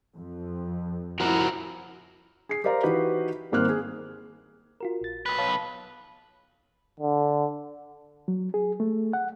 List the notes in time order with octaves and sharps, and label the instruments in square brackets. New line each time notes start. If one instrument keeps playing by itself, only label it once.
[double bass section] F2
[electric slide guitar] F3 F#4 A#4 [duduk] E4
[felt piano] G#4 C7
G4 A#4 C5 D5 F5 A#5
E3 D#4 F#4 G4 B4
G#1 G3 A#3 C4 F6 F#6
G#4
[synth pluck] F4 F#4 A#4
A#1 A6
[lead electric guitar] B1 B4
[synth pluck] C#5 F5 A5
[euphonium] D3
[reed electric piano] F#3
G#4
A3
F#5